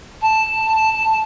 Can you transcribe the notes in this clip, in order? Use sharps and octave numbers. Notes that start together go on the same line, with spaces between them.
A5